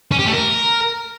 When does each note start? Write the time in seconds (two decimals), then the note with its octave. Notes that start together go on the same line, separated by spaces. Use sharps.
0.12 C#4
0.19 G4
0.26 A3
0.34 A#4